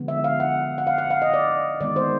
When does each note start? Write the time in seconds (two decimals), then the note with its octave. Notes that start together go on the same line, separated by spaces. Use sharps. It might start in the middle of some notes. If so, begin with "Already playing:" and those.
Already playing: D3 F3 G#3 B3
0.08 E5
0.24 F5
0.40 F#5
0.78 F#5
0.87 F5
0.98 F#5
1.11 F5
1.22 D#5
1.34 D5
1.81 D#3 G#3 B3 D5
1.96 C5